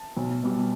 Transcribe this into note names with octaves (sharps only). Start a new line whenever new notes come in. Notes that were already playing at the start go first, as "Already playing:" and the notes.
Already playing: A5
B1
B2 G3